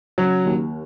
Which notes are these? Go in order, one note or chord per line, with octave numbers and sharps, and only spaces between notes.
C#3 F#3
D#2